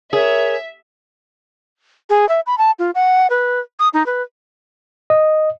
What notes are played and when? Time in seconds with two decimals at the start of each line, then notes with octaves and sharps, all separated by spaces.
0.13 G#4 A#4 C#5 E5
2.10 G#4
2.29 E5
2.47 B5
2.58 A5
2.79 F4
2.95 F#5
3.30 B4
3.79 D#6
3.94 D#4
4.06 B4
5.10 D#5